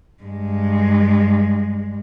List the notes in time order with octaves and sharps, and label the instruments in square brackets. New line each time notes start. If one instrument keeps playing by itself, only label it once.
[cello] G2 G#3